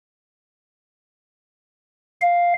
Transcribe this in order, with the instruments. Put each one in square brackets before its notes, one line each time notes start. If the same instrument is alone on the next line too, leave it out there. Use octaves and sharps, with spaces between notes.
[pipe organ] F5